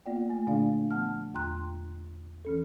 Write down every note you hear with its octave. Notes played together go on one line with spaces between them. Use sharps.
A#3 B3 F4 D5 F#5 G5
A3 G#5
A#2 D3 A3 D4 D5 F5
F3 B3 F#5 A5 F6
E2 F4 G5 A#5 C6 F#6
E3 C#4 A4